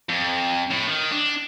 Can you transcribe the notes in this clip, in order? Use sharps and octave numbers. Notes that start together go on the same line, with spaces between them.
F2
A2
D#3
D4